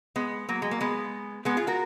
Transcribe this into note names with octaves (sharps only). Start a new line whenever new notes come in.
G#3 B3
F#3 A#3
G#3
A#3
G#3 B3
G#3 B3
F4 G#4
F#4 A#4